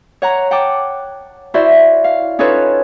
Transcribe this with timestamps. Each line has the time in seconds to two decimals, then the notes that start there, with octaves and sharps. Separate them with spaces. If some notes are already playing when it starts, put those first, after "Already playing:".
0.22 C#5 F#5 A#5
0.51 F#5 G5 A5 D6
1.54 E4 F#4 C5 D5 E5
2.04 F5
2.39 C#4 D#4 F4 A4 B4 C#5